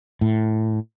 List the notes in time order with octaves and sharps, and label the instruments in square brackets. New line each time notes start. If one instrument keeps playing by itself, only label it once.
[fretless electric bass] A2